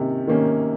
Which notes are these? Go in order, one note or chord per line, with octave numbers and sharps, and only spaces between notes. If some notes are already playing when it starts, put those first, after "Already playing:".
Already playing: C3 D#3 A#3 C#4
D#3 A#3 C#4